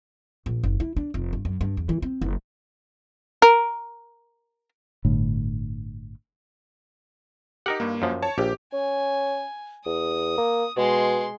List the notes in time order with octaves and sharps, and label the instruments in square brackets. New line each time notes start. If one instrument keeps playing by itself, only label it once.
[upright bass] A#1
F#1
E4
D4
F1
G2
F#2
G2
E2
E3
C4
F#1
[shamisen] A#4
[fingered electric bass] G1 A2 D3
[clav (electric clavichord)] D#4 A#4 F#5 [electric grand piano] G4
[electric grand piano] G2 A#3
[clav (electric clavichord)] F#2 F3
[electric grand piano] C#5 A5
[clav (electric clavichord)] A#1 [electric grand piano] G4
[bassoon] C#4 [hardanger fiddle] G#5
[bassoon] E2 [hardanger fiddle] D#6
[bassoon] A#3
[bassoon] B2 [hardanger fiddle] G#3 C6